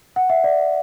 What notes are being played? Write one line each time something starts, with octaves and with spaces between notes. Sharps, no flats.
F#5
E5
D5